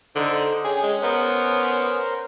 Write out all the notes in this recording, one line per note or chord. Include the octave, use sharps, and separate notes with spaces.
D3 D#4 C5
C#4 G#4 G5
G#3
B3 A#4 C5